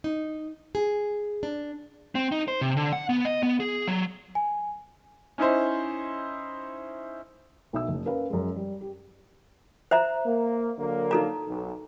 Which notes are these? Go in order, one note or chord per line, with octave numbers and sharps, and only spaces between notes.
D#4
G#4
D4
C4
D#4
C5
C3
D3
F#5
B3
D#5
B3
G#4
F#3
G#5
C#4 D#4 E4 C5
B1 E5 E6
F#1
C#4 A#4 B4 F5
F#2 G#3
G3
G4
C5 E5 A#5
A#3
D3 F#3 A#3
D#4 A4 A#5
B1